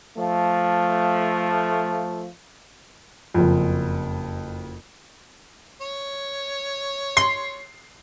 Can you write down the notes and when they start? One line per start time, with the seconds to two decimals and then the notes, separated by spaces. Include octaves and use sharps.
0.17 F3 A3
3.34 F#1 F2
5.81 C#5
7.17 C6 C7